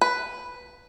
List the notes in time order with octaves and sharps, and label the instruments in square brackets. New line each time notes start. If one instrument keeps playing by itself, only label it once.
[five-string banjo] B4